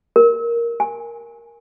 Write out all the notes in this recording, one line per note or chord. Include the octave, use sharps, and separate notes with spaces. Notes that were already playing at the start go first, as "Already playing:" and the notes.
A#4
G#5